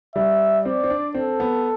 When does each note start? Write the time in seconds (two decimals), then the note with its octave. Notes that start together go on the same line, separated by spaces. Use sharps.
0.15 G3 E5
0.65 C4 D5
0.84 C4
0.90 D4
1.14 C4 A4
1.40 B3